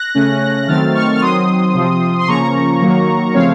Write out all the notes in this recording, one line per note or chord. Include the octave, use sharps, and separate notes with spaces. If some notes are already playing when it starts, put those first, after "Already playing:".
Already playing: F#6 A#6
C#3 A3 C#4
D#3 F#3 A3 C4 F6 A6
C#6 F6
F6
D#3 F#3 C4 C6 D#6
C3 F3 C4
C6
C#3 F3 A#3 C#4 A#5 C#6
D#3 F#3 A#3
C#3 F3 A3 C4 C#5 F5